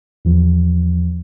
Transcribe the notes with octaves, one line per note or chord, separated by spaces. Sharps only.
E2 F3